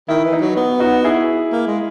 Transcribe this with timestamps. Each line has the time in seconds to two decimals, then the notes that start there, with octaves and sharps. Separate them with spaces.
0.08 D#3 E4
0.25 E3
0.33 D#4
0.41 F#3
0.56 B3
0.80 D#4 F#4
1.04 E4 G#4
1.52 A#3
1.67 G#3